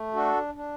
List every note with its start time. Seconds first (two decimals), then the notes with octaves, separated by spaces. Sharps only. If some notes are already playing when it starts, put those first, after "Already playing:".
Already playing: A3
0.14 D4 F#4 A4
0.54 D4